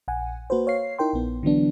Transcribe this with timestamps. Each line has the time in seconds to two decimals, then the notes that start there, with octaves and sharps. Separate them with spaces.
0.08 A#1 F#5 G#5
0.50 A#3 F#4 B4 C5
0.67 C#5 F5 C7
0.99 D#4 E4 A#4 G5 C6
1.13 A#1 B3
1.43 D3 E3 F#3 B3 D4